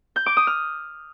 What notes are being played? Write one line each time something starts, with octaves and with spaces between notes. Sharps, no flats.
G6
D6
D#6
F6